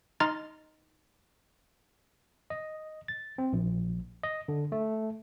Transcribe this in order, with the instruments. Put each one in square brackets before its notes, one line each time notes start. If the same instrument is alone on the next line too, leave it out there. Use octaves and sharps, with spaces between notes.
[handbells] D#4 D#5 A#5 C6 F6 A6
[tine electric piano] D#5
A6
C4
A#1
D#5
D3
A3